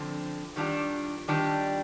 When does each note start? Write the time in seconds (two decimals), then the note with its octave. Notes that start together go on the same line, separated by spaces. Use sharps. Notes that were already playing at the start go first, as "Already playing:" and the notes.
Already playing: D3 F3 C4
0.56 D#3 G3 D4 F4
1.28 D#3 G3 D4 F4